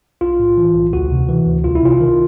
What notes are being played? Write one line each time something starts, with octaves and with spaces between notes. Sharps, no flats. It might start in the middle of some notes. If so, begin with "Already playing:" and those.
B1 F4
A2
E3
B1
D2 F#4
C3
E3
D2
C2 F4
E4
C3 F4
D#3